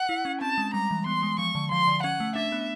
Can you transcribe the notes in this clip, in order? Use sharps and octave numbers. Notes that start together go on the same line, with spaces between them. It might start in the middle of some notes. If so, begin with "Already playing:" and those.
Already playing: F#5
E4
C#4
C4 A5
G#3
G3 A#5
E3
B3 C6
G#3
F3 C#6
D3
F3 C6
D3
C#4 F#5
A3
D4 E5
B3